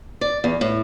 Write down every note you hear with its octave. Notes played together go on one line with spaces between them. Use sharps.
D5
E2
A2